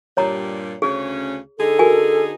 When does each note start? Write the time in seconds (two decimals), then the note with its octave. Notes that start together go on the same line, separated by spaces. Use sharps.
0.17 G2 A#2 G3 C#5 A#5
0.82 D2 C#3 C#4 G#4
1.59 D3 D#4 G#4 A4
1.79 F#4 A#4 G#5